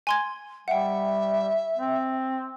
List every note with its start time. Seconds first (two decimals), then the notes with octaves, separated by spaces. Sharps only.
0.07 G#5 C6 G#6
0.68 G3 E5 F#5 G5
1.78 C4